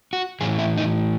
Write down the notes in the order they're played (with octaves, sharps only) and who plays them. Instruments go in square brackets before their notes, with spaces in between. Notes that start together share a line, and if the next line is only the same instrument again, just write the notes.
[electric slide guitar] F#4
A2 E3 G#4
E4
D#4